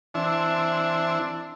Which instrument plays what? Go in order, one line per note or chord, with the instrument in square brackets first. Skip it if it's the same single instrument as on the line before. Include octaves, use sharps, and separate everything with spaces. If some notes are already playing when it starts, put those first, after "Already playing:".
[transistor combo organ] E3 C4 E4 [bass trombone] D4